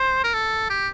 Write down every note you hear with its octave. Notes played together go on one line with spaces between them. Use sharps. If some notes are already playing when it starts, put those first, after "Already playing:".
Already playing: C5
A#4
A4
G4